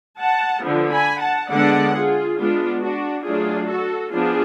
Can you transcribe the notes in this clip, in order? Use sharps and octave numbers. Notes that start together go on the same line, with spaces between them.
F#5 A5
D3 F3 B3
G#5 B5
F#5 A5
D3 G#3 B3 D4 D5 F#5
F4 G#4
G#3 B3 D4 F4
D4 F#4
F#3 A3 D4 F4 G#4
F#4 A4
F3 B3 D4 F4 G#4